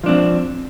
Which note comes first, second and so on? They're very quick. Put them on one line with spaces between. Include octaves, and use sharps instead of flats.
F3 D4 C4